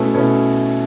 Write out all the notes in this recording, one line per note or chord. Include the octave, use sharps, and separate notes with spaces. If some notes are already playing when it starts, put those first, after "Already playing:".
Already playing: B2 A3 C#4 E4 A4
B2 A3 C#4 E4 C#5